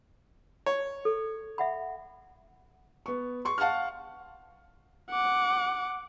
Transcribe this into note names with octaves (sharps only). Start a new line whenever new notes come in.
C#5
A4
E5 F#5 B5
B3 C#6
C6 C#6
F5 F#5 A5 C#6 F6
F#5 D6